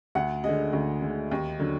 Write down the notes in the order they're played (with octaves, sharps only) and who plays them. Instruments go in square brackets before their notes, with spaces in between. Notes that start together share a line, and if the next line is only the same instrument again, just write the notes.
[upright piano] D2 F#5
D3 G#3 D#5
D2
D3 G#3
D#2
D3 F#3